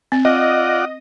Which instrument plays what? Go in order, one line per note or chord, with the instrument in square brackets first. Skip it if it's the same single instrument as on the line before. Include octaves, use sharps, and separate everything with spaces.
[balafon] C4
[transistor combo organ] F4 D5 F#5 [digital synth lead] D#5